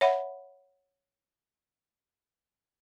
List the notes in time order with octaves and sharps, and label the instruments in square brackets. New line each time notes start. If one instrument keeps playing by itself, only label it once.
[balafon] C#5 E5 F#5 B5